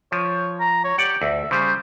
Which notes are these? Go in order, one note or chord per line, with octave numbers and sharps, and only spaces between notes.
F3 C#5
A#5
C#5
G4 D5 F#5
D2 E5
C#3 G3 C5